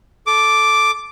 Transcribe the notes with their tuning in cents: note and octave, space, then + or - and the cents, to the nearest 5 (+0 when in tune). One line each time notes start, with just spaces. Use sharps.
A4 -10 D6 +0